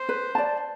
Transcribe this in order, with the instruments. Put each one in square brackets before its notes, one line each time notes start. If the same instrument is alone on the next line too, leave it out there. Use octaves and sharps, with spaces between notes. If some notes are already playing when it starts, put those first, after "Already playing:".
Already playing: [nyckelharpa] C5
[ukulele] B4
D5 A5